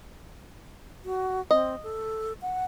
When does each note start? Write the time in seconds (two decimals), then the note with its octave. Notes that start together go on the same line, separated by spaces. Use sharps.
1.05 F#4
1.51 C4 D#5
1.83 A4
2.42 F#5